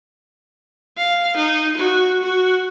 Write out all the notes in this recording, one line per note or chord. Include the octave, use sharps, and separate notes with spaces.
F5
D#4
F#4
F#4